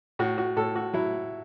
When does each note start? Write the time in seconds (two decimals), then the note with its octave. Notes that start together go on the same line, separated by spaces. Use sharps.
0.19 A2 F#4
0.38 F#4
0.56 A2 A4
0.76 F#4
0.93 F#3 E4